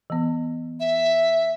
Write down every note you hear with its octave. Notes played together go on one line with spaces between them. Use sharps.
E3 B3
E5